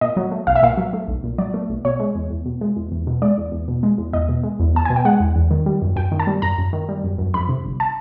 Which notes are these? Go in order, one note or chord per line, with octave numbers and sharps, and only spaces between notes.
A#2 D#5
F#3
A3
B1 F5
E5
A#2 F5
F#3
A3
B1
A#2
F#3 D5
A3
B1
B2 C#5
G#3
E2
E2
B2
G#3
E2
E2
B2
G#3 D5
E2
E2
B2
G#3
E2
E2 D#5
B2
G#3
E2
E2 A5
B2 G#5
G5
G#3 F#5
E2
E2
D#3
G3
F#2
F#2 G5
D#3
A5
G3
F#2 A#5
F#2
D#3
G3
F#2
F#2
F2 B5
C3
G1
A5